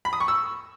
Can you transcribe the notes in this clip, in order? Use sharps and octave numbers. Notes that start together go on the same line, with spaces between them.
B5
D#6
C#6
E6